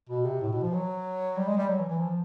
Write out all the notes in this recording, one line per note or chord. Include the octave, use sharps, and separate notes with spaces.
B2
C3
A2
B2
F3
F#3
G3
G#3
G3
F#3
E3
E3
F3